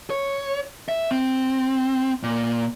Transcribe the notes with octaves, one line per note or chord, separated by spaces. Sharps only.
C#5
E5
C4
A#2